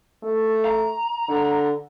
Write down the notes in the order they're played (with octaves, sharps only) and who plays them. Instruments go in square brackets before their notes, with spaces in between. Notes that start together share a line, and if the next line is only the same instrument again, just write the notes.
[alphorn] A3
[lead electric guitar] A#5
[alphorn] D3